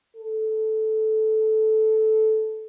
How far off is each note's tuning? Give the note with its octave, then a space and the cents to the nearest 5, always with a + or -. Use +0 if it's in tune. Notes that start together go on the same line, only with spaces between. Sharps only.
A4 -10